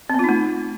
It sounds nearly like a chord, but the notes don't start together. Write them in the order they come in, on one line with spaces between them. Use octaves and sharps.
C4 B3 F4 D#4 A3